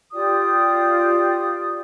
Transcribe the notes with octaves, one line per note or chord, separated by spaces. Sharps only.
F4 G4 D5 D#6